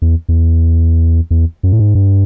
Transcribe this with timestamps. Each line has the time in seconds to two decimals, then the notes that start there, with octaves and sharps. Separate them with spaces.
0.02 E2
0.29 E2
1.31 E2
1.63 F#2
1.72 A2
1.79 G#2
1.95 G2